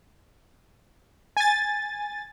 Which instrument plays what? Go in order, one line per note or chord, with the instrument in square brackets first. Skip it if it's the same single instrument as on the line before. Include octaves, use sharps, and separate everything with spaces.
[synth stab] G#5 A6